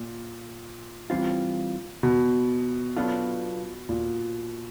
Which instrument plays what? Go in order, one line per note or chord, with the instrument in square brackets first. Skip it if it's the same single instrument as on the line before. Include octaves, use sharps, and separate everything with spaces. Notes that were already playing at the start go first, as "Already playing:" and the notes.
Already playing: [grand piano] A#2
[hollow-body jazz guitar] E3 G3 C4 F4
[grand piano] B2
[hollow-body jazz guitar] F#3 B3 D4 F4 A4
[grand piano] A#2